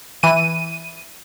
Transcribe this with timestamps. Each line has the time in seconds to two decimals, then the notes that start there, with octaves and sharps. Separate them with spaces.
0.23 E3 D#7